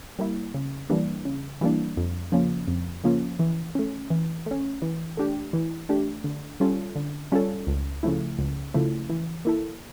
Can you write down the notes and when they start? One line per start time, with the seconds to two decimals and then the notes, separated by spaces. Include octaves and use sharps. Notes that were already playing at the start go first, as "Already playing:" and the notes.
0.19 G3 A#3 E4
0.54 C#3
0.90 E3 G3 A#3 D4
1.25 C#3
1.61 E3 G3 A#3 D4
1.97 F2
2.32 C#3 F3 A#3 C#4
2.68 F2
3.04 C#3 F3 A#3 C#4
3.39 E3
3.75 A3 C#4
4.10 E3
4.46 A3 C#4
4.82 E3
5.17 A3 D4 G4
5.53 E3
5.89 A3 D4 G4
6.24 D3
6.60 G3 C#4 F4 A4
6.95 D3
7.32 G3 C#4 F4 A4
7.67 C#2
8.03 C#3 F3 A3 E4
8.39 C#2
8.74 C#3 F3 A3 E4
9.10 E3
9.45 A#3 E4 A4